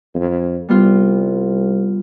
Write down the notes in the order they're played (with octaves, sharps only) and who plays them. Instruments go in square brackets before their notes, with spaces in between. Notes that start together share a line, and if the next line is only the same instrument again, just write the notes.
[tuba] F2
[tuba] C2 [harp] G3 B3 F4